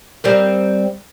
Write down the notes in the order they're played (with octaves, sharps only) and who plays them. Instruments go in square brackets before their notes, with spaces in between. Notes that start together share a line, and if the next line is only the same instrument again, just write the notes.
[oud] G3 C4 A#4